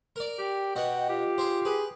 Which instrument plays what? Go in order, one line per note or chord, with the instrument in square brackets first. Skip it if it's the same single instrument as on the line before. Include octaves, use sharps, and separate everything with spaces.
[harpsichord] A#4 D5
[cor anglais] G4 [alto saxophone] G5
[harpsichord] B2 D#5 F#5 [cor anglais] F#4
[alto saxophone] F4 [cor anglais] G4
[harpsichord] G#4 C5
[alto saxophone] G#4 [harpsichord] B4